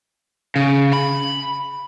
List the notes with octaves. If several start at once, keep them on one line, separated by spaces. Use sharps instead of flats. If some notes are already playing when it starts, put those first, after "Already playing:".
C#3
B5